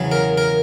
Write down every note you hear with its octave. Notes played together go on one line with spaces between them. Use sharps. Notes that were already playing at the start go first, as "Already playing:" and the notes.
Already playing: E2 C#3 F#3
A#4
A#4